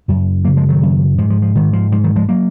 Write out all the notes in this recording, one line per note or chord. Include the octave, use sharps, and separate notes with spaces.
F#2 C#3
F#2 C#3 F#3 A#3
F3 G#3
D#3 F#3
F#2 C#3
G#2 F3
F3
F3
G#2 D#3
F3
G#2 F3
D#3 F#3
F3 G#3
F#3 A#3